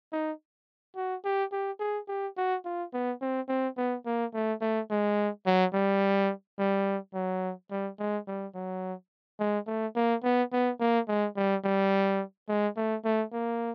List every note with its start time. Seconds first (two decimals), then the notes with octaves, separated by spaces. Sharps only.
0.12 D#4
0.96 F#4
1.24 G4
1.52 G4
1.80 G#4
2.08 G4
2.37 F#4
2.65 F4
2.93 B3
3.21 C4
3.48 C4
3.77 B3
4.05 A#3
4.34 A3
4.61 A3
4.90 G#3
5.46 F#3
5.73 G3
6.58 G3
7.14 F#3
7.71 G3
7.99 G#3
8.27 G3
8.54 F#3
9.39 G#3
9.67 A3
9.95 A#3
10.23 B3
10.52 B3
10.80 A#3
11.08 G#3
11.36 G3
11.64 G3
12.48 G#3
12.76 A3
13.04 A3
13.32 A#3